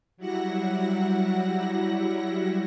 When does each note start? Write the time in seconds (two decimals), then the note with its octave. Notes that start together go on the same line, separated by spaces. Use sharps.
0.17 F#3 G3 E4 F#5 A#6